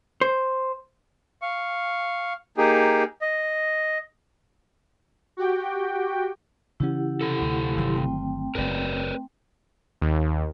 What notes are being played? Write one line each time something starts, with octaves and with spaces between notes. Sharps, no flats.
C5
F5 C#6
A#3 D#4 G4 G#4
D#5
F#4 G4 G5
C#3 E3 C#4 E4 G4 F#5
C3 A4
D2
G1 D#3 F#3 E4 G4 C6
A3 C4 G5
F#1 G#2 A#4 B4 D5
D#2